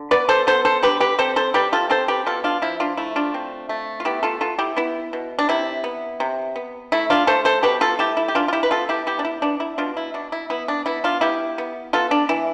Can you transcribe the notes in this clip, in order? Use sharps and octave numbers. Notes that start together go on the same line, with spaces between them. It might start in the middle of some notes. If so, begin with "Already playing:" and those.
Already playing: D3
B3 B4 D5
A4 C5
B3 A4 C5
A4 C5
D3 G4 B4
G4 B4
C4 A4 C5
A4 C5
G3 G4 B4
F4 A4
C4 A4 C5
G4 B4
B2 F4 A4
D4 F4
F3 E4
D4 F4
A3 E4
D4 F4
C4
A3
F4
B3 E4 G4
F4 A4
B3 F4 A4
E4 G4
B3 E4
B2
D4
C3 E4
B3
C3
B3
A3 E4
D4 F4
A3 A4 C5
A4 C5
B2 G4 B4
F4 A4
A3 E4 G4
E4
G4
E3 D4 F4
F4
E4 G4
B4
B3 F4 A4
E4 G4
B3 E4 G4
D4
E4
B3 D4
E4
B2 D4 F4
E4
B2 D4
E4
B3 E4
D4
B3 E4
D4 F4
B3 E4 G4
B3
B3 F4 A4
D4
E3 E4